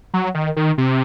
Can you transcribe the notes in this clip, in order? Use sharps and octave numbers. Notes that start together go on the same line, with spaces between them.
F#3
D#3
D#3
C3